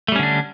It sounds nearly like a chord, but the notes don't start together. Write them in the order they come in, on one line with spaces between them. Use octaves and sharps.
A3 G3 C#4 D3 D4